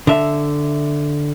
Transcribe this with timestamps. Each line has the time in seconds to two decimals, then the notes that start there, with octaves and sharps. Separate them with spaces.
0.07 D3 E5